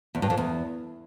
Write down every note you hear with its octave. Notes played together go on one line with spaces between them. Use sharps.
E2
G2
F2
E2